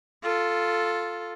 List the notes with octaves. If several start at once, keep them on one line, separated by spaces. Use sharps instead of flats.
F4 A4